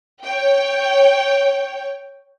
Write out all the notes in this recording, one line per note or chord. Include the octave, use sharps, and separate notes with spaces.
C#5 G5